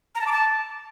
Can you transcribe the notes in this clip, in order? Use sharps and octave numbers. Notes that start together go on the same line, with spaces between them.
A#5
A5
D6
A5